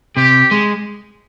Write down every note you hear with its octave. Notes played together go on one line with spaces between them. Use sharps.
C3 G4
G#3